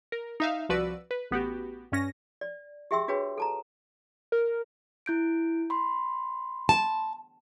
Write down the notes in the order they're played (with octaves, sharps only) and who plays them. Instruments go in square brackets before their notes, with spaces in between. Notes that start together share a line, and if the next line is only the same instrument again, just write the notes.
[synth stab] A#4
D#4 E5 F5
C2 F3 F#4 B4 D5 E6
B4
A1 B3 F#4 G4
G2 C#4 A#6
[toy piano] D5
G4 G#4 E5 G5 C6 E6
D4 F#4 G#4 B4 C#5 G5
A4 A5 A#5
[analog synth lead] A#4
[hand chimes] E4 G6 D7
B5 C6
[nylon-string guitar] A5